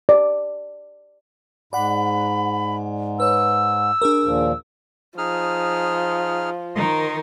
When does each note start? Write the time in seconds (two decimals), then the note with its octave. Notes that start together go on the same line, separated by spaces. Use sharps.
0.09 D5
1.73 G#2 D5 F#5 B5
3.20 B4 C#5 E6
4.02 D4 G#4 A#4
4.24 D#2 A#2 F3
5.18 F3 D#4 G#4 F6
6.75 D#3 D#4 A#4 D#5 C6